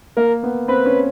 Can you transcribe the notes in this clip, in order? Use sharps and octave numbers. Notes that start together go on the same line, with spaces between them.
A#3 A#4
B3
C4 B4
C#4